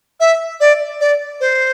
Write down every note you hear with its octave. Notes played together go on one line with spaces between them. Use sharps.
E5
D5
D5
C5